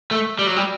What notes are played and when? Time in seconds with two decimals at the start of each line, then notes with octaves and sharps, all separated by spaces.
0.11 A3
0.39 G3
0.47 F#3
0.56 G3